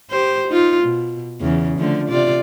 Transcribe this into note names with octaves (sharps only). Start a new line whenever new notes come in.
G4 C5
D#4 F4
B2
E2 C#3
D3 F3 A3
C3 F4 D5